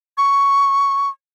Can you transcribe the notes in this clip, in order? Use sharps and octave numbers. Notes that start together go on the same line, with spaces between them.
C#6